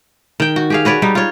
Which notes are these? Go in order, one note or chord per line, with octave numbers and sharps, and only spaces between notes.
D#3 G5
F#4
G4 G#4 F5
F#4 B4 C#5 D5
G3 D#4
F4 C#5